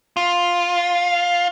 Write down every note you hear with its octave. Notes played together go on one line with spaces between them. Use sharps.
F4